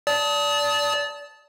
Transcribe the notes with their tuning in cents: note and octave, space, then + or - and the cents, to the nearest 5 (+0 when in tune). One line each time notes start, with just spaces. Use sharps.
D5 -20 A5 +0 D#6 +30